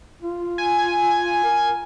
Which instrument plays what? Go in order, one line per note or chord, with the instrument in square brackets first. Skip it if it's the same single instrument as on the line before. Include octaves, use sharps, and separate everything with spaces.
[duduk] F4
[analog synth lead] G#5
[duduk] A#4